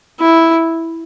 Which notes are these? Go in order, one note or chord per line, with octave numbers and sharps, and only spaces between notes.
E4